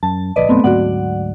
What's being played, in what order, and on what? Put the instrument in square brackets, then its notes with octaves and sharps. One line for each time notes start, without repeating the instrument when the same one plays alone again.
[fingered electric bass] F#2 [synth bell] A5
[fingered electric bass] D1 A#1 [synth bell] B4 D5 D#5
[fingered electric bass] F#2 B2 [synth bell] A3 B3 C4
[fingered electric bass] D2 G#2 F#3 [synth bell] F#4 D5 F#5